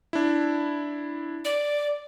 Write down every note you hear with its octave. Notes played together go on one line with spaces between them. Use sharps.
D4 E4
D5